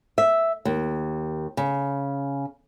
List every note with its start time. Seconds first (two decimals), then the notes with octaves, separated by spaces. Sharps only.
0.18 E5
0.65 D#2
1.57 C#3